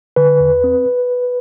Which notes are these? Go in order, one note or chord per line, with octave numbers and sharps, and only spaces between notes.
D3 B4
E2
C4